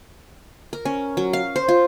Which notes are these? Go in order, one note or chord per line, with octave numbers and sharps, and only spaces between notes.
A#4
C#4
F#3
F5
C5
F4